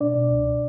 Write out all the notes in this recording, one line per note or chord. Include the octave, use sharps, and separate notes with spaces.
B2 D4 D5
B2
C#2
B2